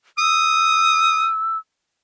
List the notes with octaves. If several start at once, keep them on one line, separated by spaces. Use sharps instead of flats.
D#6 E6